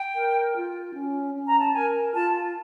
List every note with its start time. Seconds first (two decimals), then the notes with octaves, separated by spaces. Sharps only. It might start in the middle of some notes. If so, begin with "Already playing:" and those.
Already playing: G5
0.16 A#4
0.55 F4
0.95 C#4
1.35 C#4
1.47 A#5
1.60 A5
1.74 A#4 G#5
2.14 F4 A5